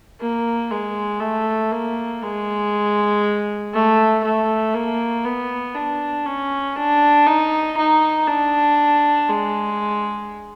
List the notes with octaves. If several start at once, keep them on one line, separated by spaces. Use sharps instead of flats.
A#3
G#3
A3
A#3
G#3
A3
A3
A#3
B3
D4
C#4
D4
D#4
D#4
D4
G#3